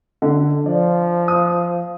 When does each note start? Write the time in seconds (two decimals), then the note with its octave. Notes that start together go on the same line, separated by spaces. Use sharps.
0.22 D3
0.66 F3 D5
1.28 D#6